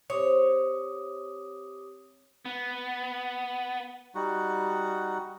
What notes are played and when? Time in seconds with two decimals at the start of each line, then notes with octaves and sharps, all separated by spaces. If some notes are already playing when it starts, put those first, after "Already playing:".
0.10 C4 G4 C5 C#5 D6 D#6
2.45 B3
4.15 G3 D#4 F#4 F#5